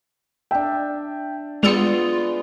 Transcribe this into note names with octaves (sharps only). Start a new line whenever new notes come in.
D4 E5 G5
G#3 B3 F4 G#4 D5 E6 C#7 F7